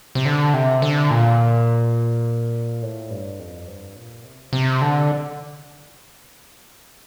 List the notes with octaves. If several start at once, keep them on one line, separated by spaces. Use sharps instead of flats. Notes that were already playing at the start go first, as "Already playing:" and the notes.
C3
D3
C3
D3
A#2
A2
G2
F2
G2
A#2
C3
C3
D3